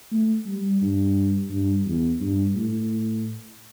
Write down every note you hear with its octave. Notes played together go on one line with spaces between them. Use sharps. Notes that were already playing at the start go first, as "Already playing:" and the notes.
A3
G3
G2
G2
E2
G2
A2